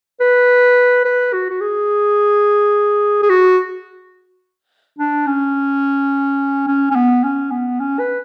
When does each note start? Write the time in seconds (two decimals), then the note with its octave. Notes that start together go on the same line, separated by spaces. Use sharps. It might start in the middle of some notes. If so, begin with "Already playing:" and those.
0.20 B4
1.05 B4
1.33 F#4
1.50 F#4
1.61 G#4
3.22 G#4
3.30 F#4
4.99 D4
5.27 C#4
6.67 C#4
6.91 C#4
6.95 B3
7.24 C#4
7.51 B3
7.80 C#4
7.99 B4